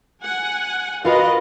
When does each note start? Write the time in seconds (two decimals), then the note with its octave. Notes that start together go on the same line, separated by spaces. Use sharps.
0.23 F#5 G#5
1.05 F4 F#4 A#4 B4 D#5 F5